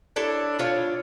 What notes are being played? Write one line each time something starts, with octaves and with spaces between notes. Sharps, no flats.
D4 E4 A4 C#5
D4 F4 C#5